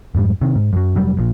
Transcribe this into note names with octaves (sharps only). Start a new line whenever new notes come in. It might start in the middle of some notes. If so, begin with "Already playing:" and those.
F2 G#2 G3
C3 D#3
G#2
F#2 F#3
F1 F#3 G3
A#1 A#2